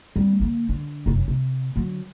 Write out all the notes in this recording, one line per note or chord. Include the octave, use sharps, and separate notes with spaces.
G3 C4
D3 A#3
D3
F1 F#2
C3
D3 F#3